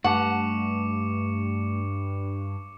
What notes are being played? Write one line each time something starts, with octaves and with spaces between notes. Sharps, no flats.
G2 A3 F#5 A5 C#6 D6 C#7